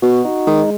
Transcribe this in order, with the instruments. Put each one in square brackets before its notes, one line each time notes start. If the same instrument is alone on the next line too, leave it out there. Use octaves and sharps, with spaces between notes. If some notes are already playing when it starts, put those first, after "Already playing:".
[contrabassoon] B2 [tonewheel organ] F#4
[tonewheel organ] D#4
[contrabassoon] D#3 [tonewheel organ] G#3